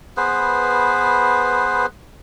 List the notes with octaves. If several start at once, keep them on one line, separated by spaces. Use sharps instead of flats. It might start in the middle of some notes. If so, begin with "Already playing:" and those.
B3 G#4 B4 C5